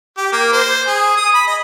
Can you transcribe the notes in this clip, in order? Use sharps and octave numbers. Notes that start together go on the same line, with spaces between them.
G4
A#3
C5
G#4
D#6
B5
D#5